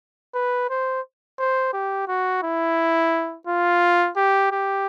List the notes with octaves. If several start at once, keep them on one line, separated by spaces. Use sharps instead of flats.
B4
C5
C5
G4
F#4
E4
F4
G4
G4